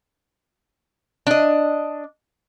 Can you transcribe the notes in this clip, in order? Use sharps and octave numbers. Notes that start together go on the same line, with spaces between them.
D4 D#5